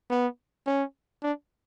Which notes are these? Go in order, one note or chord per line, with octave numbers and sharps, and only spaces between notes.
B3
C#4
D4